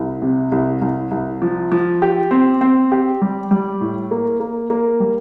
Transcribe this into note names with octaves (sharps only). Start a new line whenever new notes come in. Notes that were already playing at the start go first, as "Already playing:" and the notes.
Already playing: C2
C3
C2
C2
C2
F3
F3
G4
C4
C4
G4
G3
G3
A2
A#3
A#3
A#3
G3